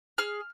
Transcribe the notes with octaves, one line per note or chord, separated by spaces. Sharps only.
G#4 F6